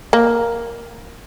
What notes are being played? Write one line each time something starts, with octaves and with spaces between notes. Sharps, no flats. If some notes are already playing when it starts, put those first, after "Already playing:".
A#3